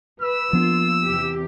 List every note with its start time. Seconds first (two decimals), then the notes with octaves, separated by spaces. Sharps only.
0.22 B4 E6
0.53 F3 A#3 B3 D4 F4
1.04 E2 C3 G4